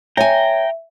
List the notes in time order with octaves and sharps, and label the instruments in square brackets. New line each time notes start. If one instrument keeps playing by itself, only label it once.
[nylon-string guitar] C#5 G#5 [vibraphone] E5 [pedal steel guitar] G5 A#5